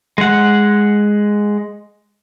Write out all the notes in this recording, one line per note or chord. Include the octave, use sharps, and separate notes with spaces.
G#3 F#5